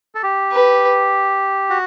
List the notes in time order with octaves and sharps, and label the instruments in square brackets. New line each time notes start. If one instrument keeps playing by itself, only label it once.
[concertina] A4
G4
[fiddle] B4
[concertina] F#4